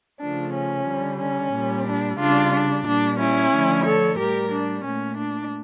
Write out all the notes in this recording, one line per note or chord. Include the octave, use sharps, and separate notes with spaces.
C#3 F3 A3 D4
C#4
D3 G3
C#4
A#2 G3
D4
C#3 G3 D4 F4
D4
A#2 G3 D4
C#4 E4
D3 F3 A3
A4 C#5
A2 G3 G4 A#4
D4
A#2 A3 C#4
D4